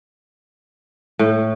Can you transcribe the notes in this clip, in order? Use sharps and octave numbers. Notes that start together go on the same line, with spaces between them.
A2